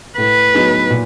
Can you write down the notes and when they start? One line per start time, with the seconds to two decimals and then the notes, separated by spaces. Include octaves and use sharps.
0.18 A2 B4
0.54 F#3 B3 D#4 G#4
0.90 A#2